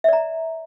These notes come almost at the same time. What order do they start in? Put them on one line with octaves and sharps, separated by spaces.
E5 D5 A#5